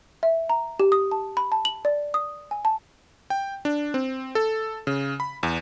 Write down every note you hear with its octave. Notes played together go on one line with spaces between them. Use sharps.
E5
A#5
G4
D#6
A5
B5
A5
F#7
D5
D#6
G#5
A5
G5
D4
C4
A4
C#3
B5
E2